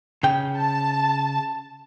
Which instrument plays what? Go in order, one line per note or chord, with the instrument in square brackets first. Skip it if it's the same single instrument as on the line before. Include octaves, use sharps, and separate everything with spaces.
[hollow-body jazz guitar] C#3 G5
[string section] A5